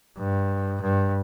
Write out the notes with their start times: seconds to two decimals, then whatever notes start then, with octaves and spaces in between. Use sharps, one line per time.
0.18 G2
0.82 G2